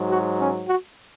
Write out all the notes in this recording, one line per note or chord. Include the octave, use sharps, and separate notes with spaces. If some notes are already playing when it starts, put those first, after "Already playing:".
Already playing: G#2 F#3
F#4
C#4
F#4